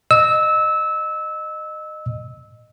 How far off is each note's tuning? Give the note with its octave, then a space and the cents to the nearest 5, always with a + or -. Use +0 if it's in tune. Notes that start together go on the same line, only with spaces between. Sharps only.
D#5 -20 E6 -20